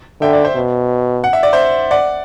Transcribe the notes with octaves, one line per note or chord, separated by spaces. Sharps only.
D3 E5 G5
D5
C5 E5
B2
F#5
E5
D5
C5 E5
D5 F#5